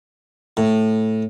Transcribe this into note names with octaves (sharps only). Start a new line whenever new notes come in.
A2